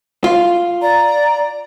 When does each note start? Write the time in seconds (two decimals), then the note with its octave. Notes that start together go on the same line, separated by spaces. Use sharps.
0.24 F4
0.82 D5 A#5